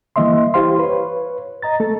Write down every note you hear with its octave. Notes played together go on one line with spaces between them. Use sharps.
E3 G3 A#3 D#5 E5 C6
E4 G4 C5 F5 C6
B4 C#5
D#5 A#5 A6
A3 A4